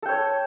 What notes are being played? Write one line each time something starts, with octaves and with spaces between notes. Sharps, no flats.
A4 C#5 G5